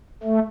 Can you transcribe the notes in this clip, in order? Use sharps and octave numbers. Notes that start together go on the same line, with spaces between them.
A3